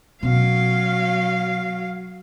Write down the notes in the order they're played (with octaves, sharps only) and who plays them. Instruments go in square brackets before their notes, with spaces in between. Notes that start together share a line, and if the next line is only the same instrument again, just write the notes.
[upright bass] B2 C#4 [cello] F#3 F5